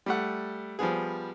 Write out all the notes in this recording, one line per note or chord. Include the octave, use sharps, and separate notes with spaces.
G3 A3 F#5
F3 G3 B3 G#4